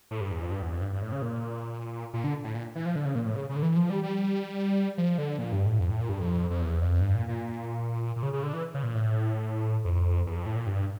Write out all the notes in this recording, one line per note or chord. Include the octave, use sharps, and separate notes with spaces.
A2
G2
E2
F2
G2
E2
F2
G2
G2
A2
C#3
A#2
A#2
D3
A2
A#2
E3
F3
D3
C#3
A#2
A2
C#3
C#3
D3
E3
F3
G3
G3
F3
D3
A#2
G2
A2
F2
A2
A#2
G2
F2
F2
E2
F2
G2
A#2
A#2
A#2
C#3
C#3
D3
E3
C#3
A#2
A2
F2
E2
F2
A2
A#2
G2